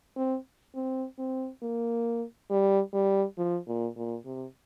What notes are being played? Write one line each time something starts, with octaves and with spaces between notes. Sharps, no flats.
C4
C4
C4
A#3
G3
G3
F3
A#2
A#2
C3